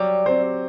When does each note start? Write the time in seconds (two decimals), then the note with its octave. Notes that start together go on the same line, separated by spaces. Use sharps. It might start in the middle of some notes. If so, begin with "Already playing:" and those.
Already playing: F#3 G3
0.26 C4 G4 C5